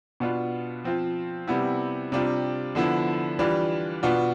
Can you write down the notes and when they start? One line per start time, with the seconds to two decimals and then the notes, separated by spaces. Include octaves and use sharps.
0.20 B2 B3 D4 F4
0.84 F3 C4 F4
1.48 C3 G3 B3 E4
2.12 C3 G3 D4 F4
2.75 D3 F3 B3 E4
3.39 E3 G3 D4 F4
4.03 B2 B3 D4 F4